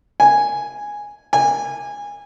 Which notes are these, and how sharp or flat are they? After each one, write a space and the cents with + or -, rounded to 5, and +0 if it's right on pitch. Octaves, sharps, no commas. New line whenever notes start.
G#5 -5
G#5 -20